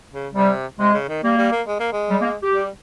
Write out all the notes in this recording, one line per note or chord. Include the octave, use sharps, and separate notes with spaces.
C#3
C3 G3
C3 G#3
C#3
D#3
G3 A#3
G3
A#3
G#3
A#3
G#3
G3
A#3
G4
G3